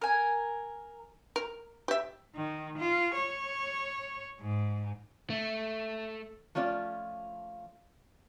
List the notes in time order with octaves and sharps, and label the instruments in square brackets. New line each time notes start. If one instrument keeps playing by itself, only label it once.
[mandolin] A#4 G#5
[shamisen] A#4
G4 E5
[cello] D#3
F4
C#5
G#2
[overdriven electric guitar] A3
[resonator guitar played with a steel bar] F3 A3 C#4 F4 D5